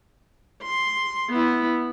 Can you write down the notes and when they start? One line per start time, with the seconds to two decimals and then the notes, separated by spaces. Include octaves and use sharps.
0.63 C6
1.30 B3 E4